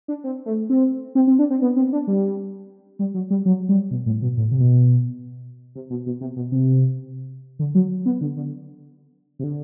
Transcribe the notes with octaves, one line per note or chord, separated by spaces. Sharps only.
D4
C4
A3
C4
C4
C4
D4
C4
B3
C4
D4
G3
G3
F#3
G3
F#3
G3
B2
A2
B2
A2
C3
B2
C3
B2
B2
C3
B2
C3
D3
F#3
B3
D3
D3
C3
D3